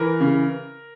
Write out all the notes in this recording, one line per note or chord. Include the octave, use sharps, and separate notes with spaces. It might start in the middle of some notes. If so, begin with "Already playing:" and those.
Already playing: E3 A#4
C#3